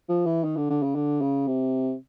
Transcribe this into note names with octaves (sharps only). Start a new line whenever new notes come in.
F3
E3
D#3
D3
D3
C#3
D3
C#3
C3